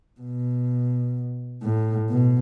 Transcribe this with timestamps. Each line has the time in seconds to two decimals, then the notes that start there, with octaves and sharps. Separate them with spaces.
0.20 B2
1.63 A2
2.10 B2